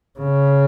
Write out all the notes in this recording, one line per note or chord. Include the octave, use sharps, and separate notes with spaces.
C#3